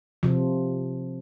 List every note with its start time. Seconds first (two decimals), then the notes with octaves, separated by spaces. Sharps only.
0.23 C3 F3